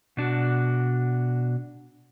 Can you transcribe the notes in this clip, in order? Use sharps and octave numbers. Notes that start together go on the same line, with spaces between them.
B2 D4 F#4